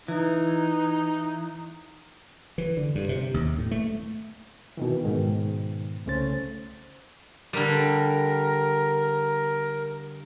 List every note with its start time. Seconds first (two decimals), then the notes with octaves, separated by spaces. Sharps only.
0.08 E3 D#4
2.58 E3
2.77 D3
2.95 G2
3.09 C3
3.34 D#2
3.59 A2
3.71 A3
4.77 B2 D#3 E3
5.05 G#2 B2 D#3
6.06 C2 C#3 A3 C#4 C5 A6
7.53 D3 G3 A#4